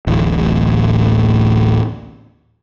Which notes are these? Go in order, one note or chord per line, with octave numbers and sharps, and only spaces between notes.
D1 A1